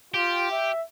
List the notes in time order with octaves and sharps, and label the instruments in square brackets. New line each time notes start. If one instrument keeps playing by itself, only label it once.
[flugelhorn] F4 [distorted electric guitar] G4
[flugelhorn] E5